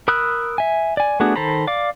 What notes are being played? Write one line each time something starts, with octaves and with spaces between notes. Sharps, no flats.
A#4 B5 D#6 E6 F#6
E5 G#5
D5 G#5
A3 B3 D4 F#4 G#4
D#3 A4 C5 A#5 B5
D5 F5 D6